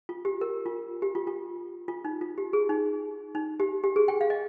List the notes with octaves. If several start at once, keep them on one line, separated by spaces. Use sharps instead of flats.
F4
G4
A#4
F4
G4
F4
F4
F4
D#4
F4
G4
G#4
D#4
D#4
G4
G4
G#4
G5
F5
D#5